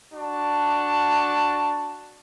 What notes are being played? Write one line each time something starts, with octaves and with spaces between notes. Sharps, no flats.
D4 F#4 A5